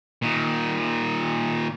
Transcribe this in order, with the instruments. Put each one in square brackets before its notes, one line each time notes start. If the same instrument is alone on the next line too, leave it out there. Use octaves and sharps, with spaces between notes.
[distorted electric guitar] A#2 D#3